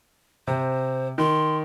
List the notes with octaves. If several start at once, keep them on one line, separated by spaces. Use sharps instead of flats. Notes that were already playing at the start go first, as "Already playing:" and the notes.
C3 C5
D#3 C6